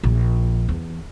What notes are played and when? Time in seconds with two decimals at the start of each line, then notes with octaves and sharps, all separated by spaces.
0.04 A#1
0.69 E2